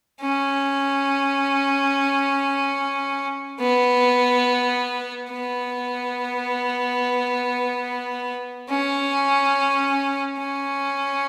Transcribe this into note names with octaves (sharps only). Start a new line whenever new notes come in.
C#4
B3
B3
C#4
C#4